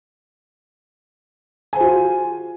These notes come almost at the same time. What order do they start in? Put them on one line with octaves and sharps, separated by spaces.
G#5 C5 G#4 F4 F#4